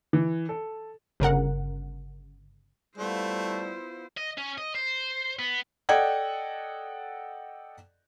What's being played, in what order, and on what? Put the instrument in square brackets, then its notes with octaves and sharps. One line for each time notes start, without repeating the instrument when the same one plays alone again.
[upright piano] E3
A4
[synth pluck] G1 C#3 A#4 F#5
[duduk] G3 [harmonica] A3 [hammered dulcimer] B3 F4 C#5 [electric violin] E4 C5
[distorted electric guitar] D#5
C#4
D#5
C5
B3
[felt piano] A4 D5 D#5 F#5 G5 G#6